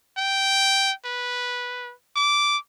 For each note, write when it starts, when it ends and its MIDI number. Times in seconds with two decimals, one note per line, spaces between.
0.18 0.92 79
1.05 1.93 71
2.16 2.57 86